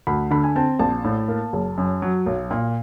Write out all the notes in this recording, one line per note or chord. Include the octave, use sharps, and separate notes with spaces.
D2 B5
D3 B5
G#5
C4 A5
A#1 A5
A2
A#3
F#1
F#2
F#3
B1
A#2